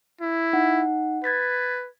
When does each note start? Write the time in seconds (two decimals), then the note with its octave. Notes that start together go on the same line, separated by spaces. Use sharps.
0.21 E4
0.53 D#4 F#5
1.24 B4 G#6 A6 B6